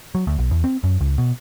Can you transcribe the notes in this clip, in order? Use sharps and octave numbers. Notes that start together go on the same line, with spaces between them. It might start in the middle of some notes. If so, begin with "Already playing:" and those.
F#3
D2
B1
E2
C4
F#2
C#2
B2